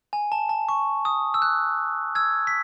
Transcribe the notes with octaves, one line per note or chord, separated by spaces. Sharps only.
G#5
A5
A5
C#6
D#6
E6
F#6
E6 G#6
B6